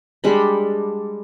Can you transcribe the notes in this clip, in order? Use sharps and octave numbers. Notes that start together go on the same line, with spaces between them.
G3 G#3 D4 B5